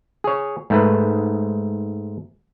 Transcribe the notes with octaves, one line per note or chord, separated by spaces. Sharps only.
G#4 C#5
G#2 A3 B4